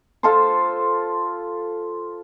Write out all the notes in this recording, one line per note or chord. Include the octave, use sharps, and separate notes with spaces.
F4 A4 C5